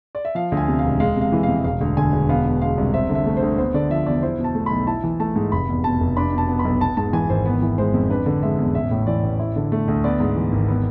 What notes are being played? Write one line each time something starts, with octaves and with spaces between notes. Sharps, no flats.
D5
E5
F3 F5
D2
G#5
C3
F5
E1
G#3 F5
C3
F5
E3
F5
F2
E1 F5
D2
D3 G#5
E1
B3 F5
B2
G#3 F5
C2
C4 E5
D3
E5
A3
C5
D2
B3 C5
D3 D5
F3 E5
E2 D5
E4 C5
B2
A5
A3
B1 B5
E4 A5
E3
A3 A5
G#2
F1 B5
E2
B2 A5
F1
D4 B5
B2
A5
B3
B5
B1
B3 A5
G#2 A5
E3 G#5
G#1 C5
B3
E3
G#3 C5
F2
D4 B4
D3
G#3 E5
E2
A1 E5
A2
E3 D5
A1
E4
D3
A3
D2
B3 D5
G#2
E3
G#1
B3